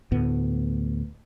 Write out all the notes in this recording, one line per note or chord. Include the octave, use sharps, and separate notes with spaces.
D2 A2 B3